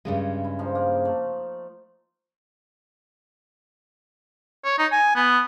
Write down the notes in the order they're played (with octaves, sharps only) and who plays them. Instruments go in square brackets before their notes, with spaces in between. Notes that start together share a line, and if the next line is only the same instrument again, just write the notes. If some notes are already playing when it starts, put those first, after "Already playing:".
[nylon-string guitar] G2 C#3 G#3
[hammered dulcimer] E4
F3 C4 D#4
A#3
A3
[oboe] C#5
D#4
G#5
B3